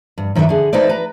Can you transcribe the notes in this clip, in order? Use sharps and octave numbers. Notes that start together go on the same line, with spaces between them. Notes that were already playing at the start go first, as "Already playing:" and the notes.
G2
F#2 D#3 D4 B4 E5
D3 G#4
D#4 A4 B4 C5 D5
B4 A#5